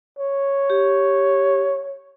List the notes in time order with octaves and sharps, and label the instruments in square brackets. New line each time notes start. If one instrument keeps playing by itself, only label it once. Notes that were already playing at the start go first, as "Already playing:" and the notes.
[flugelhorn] C#5
[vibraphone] G4